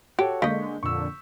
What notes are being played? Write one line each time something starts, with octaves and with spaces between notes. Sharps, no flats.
F#4 G4 A4 C#5
D3 G#3 A#3 D#5 C#6 G6 B6
F2 A#2 D3 C#6 E6